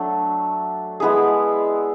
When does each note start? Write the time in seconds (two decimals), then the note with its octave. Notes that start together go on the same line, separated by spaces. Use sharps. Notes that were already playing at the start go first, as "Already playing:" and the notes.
Already playing: F#3 A3 D4 A4
1.00 G#3 B3 E4 G#4